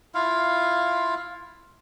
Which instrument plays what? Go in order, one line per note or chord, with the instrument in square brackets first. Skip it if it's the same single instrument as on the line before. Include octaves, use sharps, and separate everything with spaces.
[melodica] E4 F4 F5